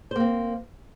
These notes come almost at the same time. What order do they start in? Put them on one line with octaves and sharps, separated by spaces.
C5 A#3 C4